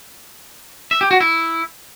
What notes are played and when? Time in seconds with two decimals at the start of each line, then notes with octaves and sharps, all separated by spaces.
0.91 E5
1.01 G4
1.11 F#4
1.21 E4